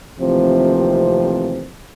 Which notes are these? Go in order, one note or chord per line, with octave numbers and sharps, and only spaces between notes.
D#2 C3 E3 F3 A3 C4